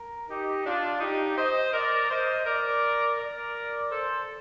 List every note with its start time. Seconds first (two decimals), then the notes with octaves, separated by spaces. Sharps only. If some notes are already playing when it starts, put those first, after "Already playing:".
Already playing: A#4
0.29 D#4 G4
0.66 D4 F4
1.01 D#4 G4
1.37 C5 D#5
1.73 A#4 D5
2.09 C5 D#5
2.45 A#4 D5
3.18 A#4 D5
3.91 A4 C5